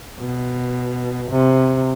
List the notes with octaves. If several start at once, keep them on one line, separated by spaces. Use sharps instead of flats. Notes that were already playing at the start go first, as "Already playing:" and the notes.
B2
C3